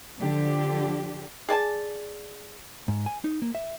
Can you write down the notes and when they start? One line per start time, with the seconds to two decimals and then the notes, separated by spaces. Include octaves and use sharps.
0.19 D3 F3 D4 G4
1.49 G#4 D5 G#5 A5
2.88 G#2
3.06 G#5
3.24 D#4
3.42 A#3
3.55 E5